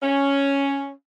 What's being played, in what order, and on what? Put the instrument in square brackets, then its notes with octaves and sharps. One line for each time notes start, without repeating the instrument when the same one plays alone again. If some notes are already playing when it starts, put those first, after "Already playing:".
[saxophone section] C#4